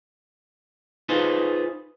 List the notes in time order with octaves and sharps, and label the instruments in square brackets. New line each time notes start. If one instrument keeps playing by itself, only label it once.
[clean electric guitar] D#4 F4 G#4 B4 C5